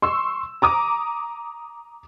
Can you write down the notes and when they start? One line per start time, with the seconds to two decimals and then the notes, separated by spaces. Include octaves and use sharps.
0.02 C6 C#6 E6
0.62 A#5 D6 D#6